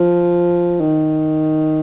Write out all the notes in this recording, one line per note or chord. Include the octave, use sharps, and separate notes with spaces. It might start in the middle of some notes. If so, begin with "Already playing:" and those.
Already playing: F3
D#3